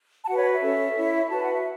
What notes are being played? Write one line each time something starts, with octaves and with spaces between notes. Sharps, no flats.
A5
F#4 B4 F#5
C#5
E5
C#4 A4 C#5
E4 C#5
F#4 B4 A5
F#5
E5